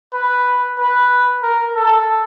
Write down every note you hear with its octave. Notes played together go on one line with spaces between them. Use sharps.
B4
B4
A#4
A4